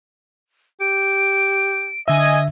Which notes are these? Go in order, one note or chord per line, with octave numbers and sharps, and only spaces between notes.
G4 D7
D3 D#5 E5 G#5